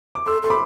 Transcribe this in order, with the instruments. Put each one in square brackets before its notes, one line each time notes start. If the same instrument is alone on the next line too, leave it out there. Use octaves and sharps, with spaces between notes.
[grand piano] D6
[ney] A4 [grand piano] C6 E6
[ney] A4 [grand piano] C6
[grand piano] B5 D6